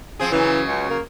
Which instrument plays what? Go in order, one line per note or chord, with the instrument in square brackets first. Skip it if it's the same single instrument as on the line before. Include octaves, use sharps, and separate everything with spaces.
[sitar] F3 C4 G#4
[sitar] C#3 F#3 [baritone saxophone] E3
[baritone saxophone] C#2
A#3